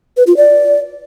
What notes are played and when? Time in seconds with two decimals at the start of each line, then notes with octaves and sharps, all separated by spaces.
0.17 B4
0.27 F4
0.37 D5